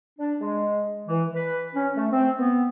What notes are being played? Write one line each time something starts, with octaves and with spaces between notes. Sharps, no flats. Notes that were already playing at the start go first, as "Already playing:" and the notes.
D4
G#3
E3
B4
C#4
A3
C4
B3